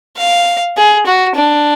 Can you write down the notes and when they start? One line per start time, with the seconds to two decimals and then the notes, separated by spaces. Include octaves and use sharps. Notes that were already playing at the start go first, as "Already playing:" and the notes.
0.18 F5
0.77 G#4
1.06 F#4
1.35 D4